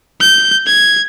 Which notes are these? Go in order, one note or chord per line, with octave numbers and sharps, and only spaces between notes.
G6
G#6